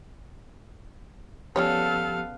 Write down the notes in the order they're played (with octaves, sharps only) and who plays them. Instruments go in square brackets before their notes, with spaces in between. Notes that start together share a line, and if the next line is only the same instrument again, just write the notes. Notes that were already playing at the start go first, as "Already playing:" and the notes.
[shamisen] C#3 G3 C#5 [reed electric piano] F3 G4 [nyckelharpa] B3 F5 [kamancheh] A4